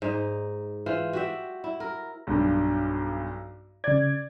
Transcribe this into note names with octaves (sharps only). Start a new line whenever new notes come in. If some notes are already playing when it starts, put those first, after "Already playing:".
G#2 D#4
E3 F4 C5
F#4 G4 E5
E4
A#4
B1 G2
C#3 D5 G#6